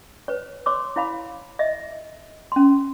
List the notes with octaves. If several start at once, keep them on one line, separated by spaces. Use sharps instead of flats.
B4 C#5
C#5 C6 D6 E6
E4 C#5 F5 B5
D#5 E5
C#4 C6